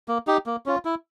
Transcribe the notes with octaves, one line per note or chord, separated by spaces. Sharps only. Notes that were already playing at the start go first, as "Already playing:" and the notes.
A#3
D#4 G4
A#3
C#4 F4
E4